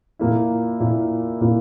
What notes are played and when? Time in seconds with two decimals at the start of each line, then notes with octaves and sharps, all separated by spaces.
0.19 A#2 A#3 E4
0.80 A#2 A#3 E4
1.41 A#2 A#3 E4